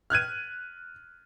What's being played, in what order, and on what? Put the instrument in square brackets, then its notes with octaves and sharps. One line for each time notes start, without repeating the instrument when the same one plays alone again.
[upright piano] F6 F#6 G#6 D#7